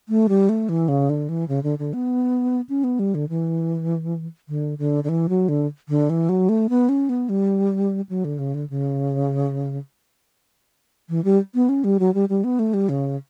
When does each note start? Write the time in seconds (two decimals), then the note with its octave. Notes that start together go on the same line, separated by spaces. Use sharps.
0.09 A3
0.29 G3
0.49 A3
0.69 E3
0.88 C#3
1.10 D3
1.29 E3
1.48 C#3
1.63 D3
1.79 D3
1.93 B3
2.69 C#4
2.84 B3
2.99 G3
3.15 D3
3.29 E3
4.49 D3
4.78 D3
5.04 D3
5.09 E3
5.29 F#3
5.49 D3
5.89 D3
6.10 E3
6.29 F#3
6.49 A3
6.69 B3
6.89 C#4
7.09 B3
7.29 G3
8.09 F#3
8.25 D3
8.39 C#3
8.54 D3
8.70 C#3
11.09 E3
11.24 G3
11.55 B3
11.69 C#4
11.84 G3
12.00 F#3
12.14 G3
12.29 G3
12.44 B3
12.59 A3
12.74 G3
12.89 C#3